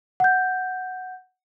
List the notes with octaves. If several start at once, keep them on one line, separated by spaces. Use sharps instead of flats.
F#5 G6